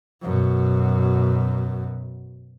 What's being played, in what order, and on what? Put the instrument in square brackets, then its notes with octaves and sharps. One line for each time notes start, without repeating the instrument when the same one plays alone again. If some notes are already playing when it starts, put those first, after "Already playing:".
[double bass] F#2 B2